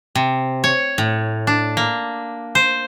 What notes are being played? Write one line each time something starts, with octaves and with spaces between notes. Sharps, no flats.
C3
C#5
A2
D4
A#3
C5